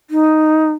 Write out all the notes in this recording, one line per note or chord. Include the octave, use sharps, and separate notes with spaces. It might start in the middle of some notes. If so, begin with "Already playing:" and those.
D#4